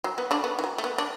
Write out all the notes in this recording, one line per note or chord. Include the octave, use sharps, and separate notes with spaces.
F#3
B3
D3 D4
B3
E3
F#3
A3
B3
D4